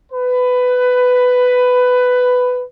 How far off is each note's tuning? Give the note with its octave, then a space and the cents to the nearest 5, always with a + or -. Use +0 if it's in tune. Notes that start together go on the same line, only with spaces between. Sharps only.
B4 +15